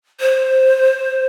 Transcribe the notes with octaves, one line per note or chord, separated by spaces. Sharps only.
C5